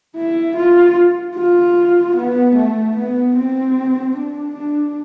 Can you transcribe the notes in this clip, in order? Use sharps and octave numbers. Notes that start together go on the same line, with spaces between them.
E4
F4
F4
B3
A3
B3
C4
D4
D4